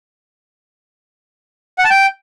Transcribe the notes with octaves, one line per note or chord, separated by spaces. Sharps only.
F#5
A5
G5